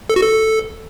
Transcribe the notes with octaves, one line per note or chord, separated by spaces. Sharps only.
A4
F#4
A4